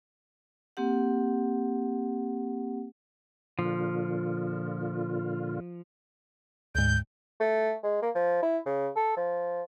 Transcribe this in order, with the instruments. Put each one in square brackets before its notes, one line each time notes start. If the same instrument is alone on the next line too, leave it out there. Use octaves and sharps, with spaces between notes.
[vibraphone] A#3 C4 G4 F#5
[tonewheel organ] A#2 D3 F4 [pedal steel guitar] F3
[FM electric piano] D2 G#2 [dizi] G6
[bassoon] A3
G#3
A#3
F3
E4
C#3
A4
F3